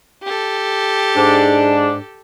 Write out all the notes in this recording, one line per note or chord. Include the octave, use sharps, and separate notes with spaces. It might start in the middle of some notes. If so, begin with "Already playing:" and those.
G4 A4
G#2 D4